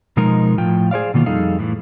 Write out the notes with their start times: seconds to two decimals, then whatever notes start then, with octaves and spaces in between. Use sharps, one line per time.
0.17 B2 F3 G#3 D#4 A#4
0.58 A2 F3 F4 G5
0.91 G#4 C5 D5 F5
1.14 B2 D#3 A#3 F4
1.26 F2 G3 D#4 G#4 A4 F5
1.59 A2 E3